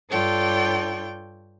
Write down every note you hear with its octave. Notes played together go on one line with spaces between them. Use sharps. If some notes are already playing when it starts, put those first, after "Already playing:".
G2 D4 F4 A4 C#5 G5